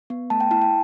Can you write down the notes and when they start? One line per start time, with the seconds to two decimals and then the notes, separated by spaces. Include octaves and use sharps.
0.10 B3
0.30 A3 A5
0.40 G5
0.51 E4 A5
0.62 G5